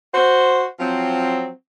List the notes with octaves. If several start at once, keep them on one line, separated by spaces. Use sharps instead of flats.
F#4 C5
F3 F#3 C4